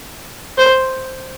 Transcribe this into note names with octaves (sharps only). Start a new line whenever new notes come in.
C5